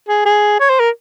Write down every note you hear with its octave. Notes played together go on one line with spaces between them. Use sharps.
G#4
G#4
C#5
C5
A#4